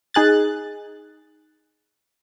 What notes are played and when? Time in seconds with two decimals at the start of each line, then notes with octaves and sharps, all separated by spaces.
0.14 D#4 G#4 F#6 A6